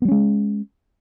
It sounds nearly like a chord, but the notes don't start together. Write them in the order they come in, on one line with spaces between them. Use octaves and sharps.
B3 G3 C#4 G#3